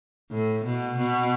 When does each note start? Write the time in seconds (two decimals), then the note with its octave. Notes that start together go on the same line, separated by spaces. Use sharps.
0.32 A2
0.65 B2
0.98 B2